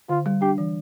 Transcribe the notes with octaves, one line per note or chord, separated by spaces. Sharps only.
D3 F4
G3
D4 G4
E3